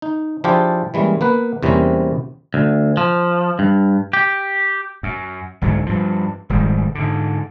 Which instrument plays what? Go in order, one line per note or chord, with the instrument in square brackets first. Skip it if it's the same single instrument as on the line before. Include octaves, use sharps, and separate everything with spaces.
[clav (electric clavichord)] D#4
F3 D4 E4 F4 G4 G#4
E3 G3 G#3 A#3 C#4
A#3 B3 B4
E2 C3 G3 A#3 C4 C#4
[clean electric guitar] D2
F3
G2
G4
[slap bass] F#2
C2 G#2 D3 F#3
G2 F3
F1 G#2 D#3 G3
G#2 D3